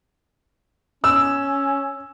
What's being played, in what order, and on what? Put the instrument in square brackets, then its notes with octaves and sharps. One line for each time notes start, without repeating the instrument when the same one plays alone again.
[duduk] C#4 [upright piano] E6